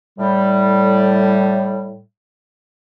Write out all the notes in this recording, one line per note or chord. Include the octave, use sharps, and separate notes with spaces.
A2 G3